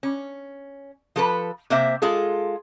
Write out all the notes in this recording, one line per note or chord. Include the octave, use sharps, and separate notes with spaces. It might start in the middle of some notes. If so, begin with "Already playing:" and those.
C#4
F3 A4 B4
C3 A#3 C5 E5
G#3 F4 G#4 A4